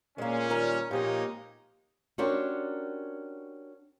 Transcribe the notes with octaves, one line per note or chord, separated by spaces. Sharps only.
A#2 G#3 A#3 C#4
D#3 G3 A#4
A#2 F3 G#3 A#3 C4 D#4 G4 C#5
C#4 D4 F#4 G4 A#4 C5